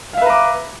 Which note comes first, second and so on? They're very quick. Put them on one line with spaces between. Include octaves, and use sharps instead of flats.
F5 E5 B4 A#5 D6